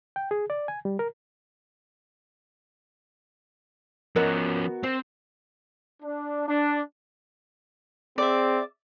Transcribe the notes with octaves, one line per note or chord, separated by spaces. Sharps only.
G5
G#4
D5
G#5
G3
A#4
F3 B3 C#4 F#4 A#4 D#5 A#5
C4 C5
D4
D4
C4 G#4 D5 E5